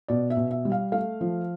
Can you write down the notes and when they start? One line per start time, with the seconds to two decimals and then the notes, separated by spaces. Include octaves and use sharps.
0.08 B2 D5
0.30 E5
0.37 B2
0.51 E5
0.65 G3
0.72 F5
0.92 A3 F5
1.21 F3